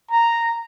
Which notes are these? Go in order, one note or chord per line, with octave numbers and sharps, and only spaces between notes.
A#5